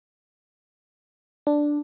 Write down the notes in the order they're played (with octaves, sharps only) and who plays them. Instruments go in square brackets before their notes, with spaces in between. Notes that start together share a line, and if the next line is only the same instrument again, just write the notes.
[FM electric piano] D4